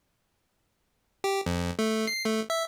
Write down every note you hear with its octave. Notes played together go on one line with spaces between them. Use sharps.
G4
F2
A3
C7
A3
E5